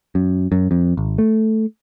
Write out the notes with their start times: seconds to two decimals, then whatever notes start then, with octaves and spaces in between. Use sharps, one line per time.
0.15 F#2
0.52 F#2
0.71 F2
0.97 G#1
1.18 A3